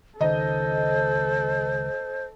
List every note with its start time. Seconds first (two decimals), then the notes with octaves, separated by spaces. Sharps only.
0.21 C#2 D#3 A4 C5 D#5 A#5